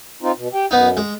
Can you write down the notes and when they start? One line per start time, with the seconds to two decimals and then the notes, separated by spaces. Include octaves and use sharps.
0.22 C4 D#4 F4
0.36 B2
0.54 G4 G5
0.71 F#2 B3 D#4
0.97 G#3